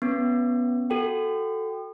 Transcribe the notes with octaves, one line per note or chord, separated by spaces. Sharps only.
B3 C#4
F#4 A4 G5